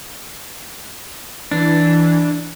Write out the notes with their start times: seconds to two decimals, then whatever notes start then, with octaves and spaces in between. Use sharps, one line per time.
1.51 E3 D4